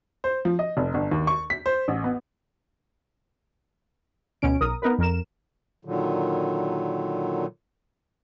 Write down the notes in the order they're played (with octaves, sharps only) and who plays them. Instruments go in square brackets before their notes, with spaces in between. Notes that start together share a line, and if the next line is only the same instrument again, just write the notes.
[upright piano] C5
F3
D#5
F1
G1
D#2
C#6
B6
C5
A1
B3
[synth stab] D2 B2 C#4 D7
B1 A#4 D#6
B3 D#4 A#4 B4
F2 A#4 E7
[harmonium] A#2 D3 D#3 F#3